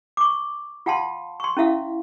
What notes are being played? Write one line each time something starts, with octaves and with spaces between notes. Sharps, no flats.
C#6 D6
F4 F5 F#5 A5 C6
C6 C#6
C#4 E4 E5 F5